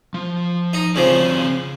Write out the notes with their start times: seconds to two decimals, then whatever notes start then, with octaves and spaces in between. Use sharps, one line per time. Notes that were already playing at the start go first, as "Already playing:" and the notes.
0.14 F3
0.73 D#4
0.96 C#3 F3 C4 D5 F5